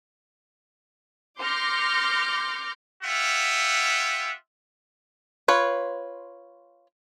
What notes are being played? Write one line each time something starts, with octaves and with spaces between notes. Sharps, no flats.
C6 D6 F6 G6 A#6 C#7
F4 G4 E5 F#5
F4 B4 C#5